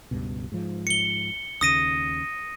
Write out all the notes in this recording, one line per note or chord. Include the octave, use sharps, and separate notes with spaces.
C#2 G2 B2
G#2 F3
C#7 G7
D#2 C#3 D#6 A#6 D#7